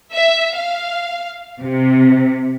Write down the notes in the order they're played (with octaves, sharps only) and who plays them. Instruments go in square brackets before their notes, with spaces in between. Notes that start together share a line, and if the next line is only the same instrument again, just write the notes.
[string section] E5
F5
C3